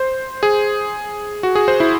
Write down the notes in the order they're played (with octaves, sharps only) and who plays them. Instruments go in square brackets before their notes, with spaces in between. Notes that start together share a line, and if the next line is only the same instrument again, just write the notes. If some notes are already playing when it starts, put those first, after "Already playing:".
Already playing: [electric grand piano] C5
G#4
F#4
G#4
C5
E4